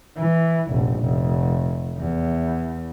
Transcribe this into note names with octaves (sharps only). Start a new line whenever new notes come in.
E3
F1 A#1
F1
E2